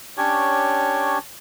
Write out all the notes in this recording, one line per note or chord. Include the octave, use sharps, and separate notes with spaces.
C#4 D4 G4 C#5